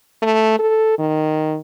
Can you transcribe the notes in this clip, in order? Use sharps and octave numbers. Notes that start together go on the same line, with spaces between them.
A3
A4
D#3